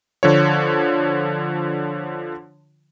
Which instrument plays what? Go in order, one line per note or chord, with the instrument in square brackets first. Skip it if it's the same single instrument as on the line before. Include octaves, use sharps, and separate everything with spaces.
[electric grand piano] D3 F3 C#5